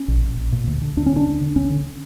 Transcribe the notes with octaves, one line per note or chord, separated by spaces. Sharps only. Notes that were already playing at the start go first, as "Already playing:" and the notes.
Already playing: C#4
A#1
A#2
A#1
A#2
D2
D3
D2 D4
C#4
D3 D4
D2
D3
D2 C#4
D3